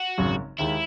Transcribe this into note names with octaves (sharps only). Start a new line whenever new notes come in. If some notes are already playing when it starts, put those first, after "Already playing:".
Already playing: F#4
G#1 F#2 C#3 F#3
D#2 D#3 G#3 E4